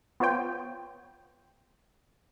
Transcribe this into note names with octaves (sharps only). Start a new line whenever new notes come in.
B3 F4 C5 C#5 G5